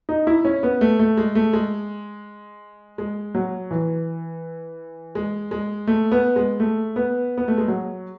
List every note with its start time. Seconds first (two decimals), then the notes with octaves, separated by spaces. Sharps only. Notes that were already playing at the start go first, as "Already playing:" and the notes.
0.09 D#4
0.27 E4
0.45 C#4
0.63 B3
0.81 A3
0.99 A3
1.17 G#3
1.35 A3
1.53 G#3
2.98 G#3
3.35 F#3
3.71 E3
5.15 G#3
5.51 G#3
5.87 A3
6.12 B3
6.36 G#3
6.60 A3
6.96 B3
7.38 B3
7.48 A3
7.58 G#3
7.68 F#3